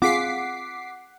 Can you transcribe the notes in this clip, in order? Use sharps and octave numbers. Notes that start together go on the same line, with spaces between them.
C4 F4 G#4 F#5 D6 B6 C7